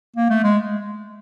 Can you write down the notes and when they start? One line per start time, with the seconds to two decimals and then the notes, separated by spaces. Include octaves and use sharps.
0.16 A#3
0.30 A3
0.44 G#3